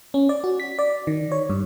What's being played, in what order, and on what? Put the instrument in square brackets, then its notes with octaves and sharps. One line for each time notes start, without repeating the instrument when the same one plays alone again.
[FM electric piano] C#4
D5
F#4
B6
D5
D#3
C#5
G2